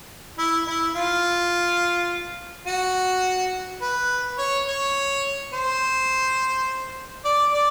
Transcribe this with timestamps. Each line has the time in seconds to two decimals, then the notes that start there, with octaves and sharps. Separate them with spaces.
0.38 E4
0.67 E4
0.96 F4
2.67 F#4
3.82 B4
4.38 C#5
4.67 C#5
5.53 C5
7.25 D5
7.53 D5